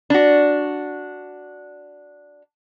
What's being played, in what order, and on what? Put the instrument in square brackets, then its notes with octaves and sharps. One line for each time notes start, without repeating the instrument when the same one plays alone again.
[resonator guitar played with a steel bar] D4 F#4